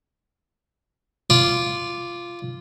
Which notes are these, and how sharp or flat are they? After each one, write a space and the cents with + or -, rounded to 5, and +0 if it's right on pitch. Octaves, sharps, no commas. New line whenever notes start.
F4 -10 D5 +0